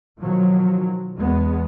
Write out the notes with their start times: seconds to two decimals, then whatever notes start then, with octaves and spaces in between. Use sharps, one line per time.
0.19 B2 D#3 F3 F#3
1.17 E2 G#3 B3